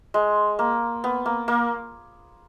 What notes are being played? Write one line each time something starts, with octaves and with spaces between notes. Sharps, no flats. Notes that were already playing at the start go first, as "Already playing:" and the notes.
G#3
A#3
B3
A#3
A#3